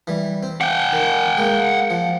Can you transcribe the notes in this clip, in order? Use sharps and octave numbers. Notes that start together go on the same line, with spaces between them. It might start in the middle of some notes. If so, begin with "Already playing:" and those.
E3 G3
C4
F#5 G5
D#3
G#3 A#3
F3